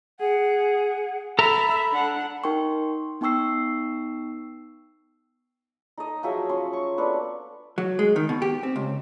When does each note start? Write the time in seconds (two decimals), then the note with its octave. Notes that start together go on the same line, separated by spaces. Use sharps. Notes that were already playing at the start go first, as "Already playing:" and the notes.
0.20 G#4 F#5
1.39 A4 E5 A#5 B5
1.92 D4 F#5
2.44 D#4 A#4 G5 C6 C#6
3.21 B3 D#4 G5 C#6 E6 C7
5.97 D#4 A4 D#5
6.23 F3 F#3 G#4 E5
6.49 C#4 C6
6.73 C#6
6.97 B3 D4 A4 B4
7.78 F#3
7.99 G#3
8.16 D#3
8.29 B2
8.42 G4
8.63 C4
8.76 C#2